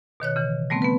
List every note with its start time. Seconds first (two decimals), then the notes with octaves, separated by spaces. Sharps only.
0.20 B2 D#3 C#5 F#6
0.36 C#3 E3
0.70 G3 A3 B3 C4
0.82 B3 B4